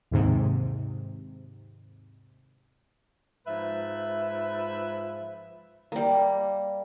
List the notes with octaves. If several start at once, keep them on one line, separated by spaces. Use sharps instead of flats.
D#2 G#2 C3
G#2 F3 B4 E5
G3 A#3